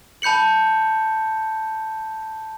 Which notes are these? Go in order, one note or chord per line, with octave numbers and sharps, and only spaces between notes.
A5 B5 G6 C#7 F#7